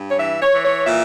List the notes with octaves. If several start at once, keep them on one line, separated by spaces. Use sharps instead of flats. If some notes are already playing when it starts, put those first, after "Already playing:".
Already playing: G2
C#5
E3 E5
C#5
E3
C#5
A#2 E5